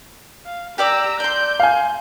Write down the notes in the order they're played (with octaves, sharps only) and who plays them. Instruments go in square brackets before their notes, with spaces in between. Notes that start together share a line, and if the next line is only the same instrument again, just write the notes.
[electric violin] F5
[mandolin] G4 D5 D6 [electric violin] A#5 E6
[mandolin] D5 C6 [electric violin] G6
[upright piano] F5 G#5